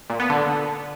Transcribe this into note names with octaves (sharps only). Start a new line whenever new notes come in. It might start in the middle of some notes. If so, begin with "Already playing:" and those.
A#2
B3
D3